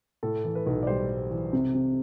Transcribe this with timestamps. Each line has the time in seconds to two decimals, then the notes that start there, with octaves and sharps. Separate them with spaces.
0.23 A2 A4
0.44 E3
0.55 B4
0.66 B1
0.83 D5
0.87 G3 C5
1.10 G3
1.31 E3
1.53 C3
1.74 C3